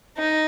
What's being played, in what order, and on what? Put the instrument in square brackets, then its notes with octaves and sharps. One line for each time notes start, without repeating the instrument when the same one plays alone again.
[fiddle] D#4